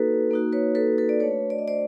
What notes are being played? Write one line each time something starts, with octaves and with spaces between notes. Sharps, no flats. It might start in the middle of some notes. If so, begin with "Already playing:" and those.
Already playing: A#3 D#4 F#4 A4 B4
A#3 D#4 F#4
B4 C#5
A4 B4
A4 B4
D5
A3 D4 F#4 B4 C#5
D5
D#5
C5 D5